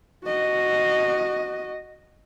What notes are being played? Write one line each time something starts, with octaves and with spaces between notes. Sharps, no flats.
F#4 D#5